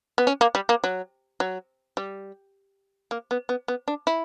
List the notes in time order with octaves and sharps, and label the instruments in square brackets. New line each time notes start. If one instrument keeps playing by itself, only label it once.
[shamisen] B3
C#4
A#3
G3
A#3
F#3
F#3
G3
A#3
B3
B3
B3
D4
E4